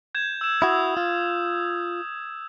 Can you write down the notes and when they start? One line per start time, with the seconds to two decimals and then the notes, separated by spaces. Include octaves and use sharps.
0.15 G6 G#6 E7
0.41 E6 E7
0.62 E4 F#4 D#6
0.97 F4